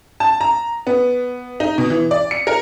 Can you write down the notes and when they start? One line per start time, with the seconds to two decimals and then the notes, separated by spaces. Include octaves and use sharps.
0.20 A5
0.41 A#5
0.87 B3
1.60 D#4
1.78 B2
1.90 E3
2.11 D5
2.31 C#7
2.47 A#4